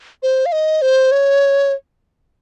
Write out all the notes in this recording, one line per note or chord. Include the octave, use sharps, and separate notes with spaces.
C5
F5
D#5
C5
C#5